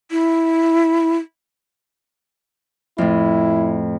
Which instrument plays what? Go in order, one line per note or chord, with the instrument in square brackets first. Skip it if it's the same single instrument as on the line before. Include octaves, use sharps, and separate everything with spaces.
[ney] E4
[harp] F2 A2 [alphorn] E4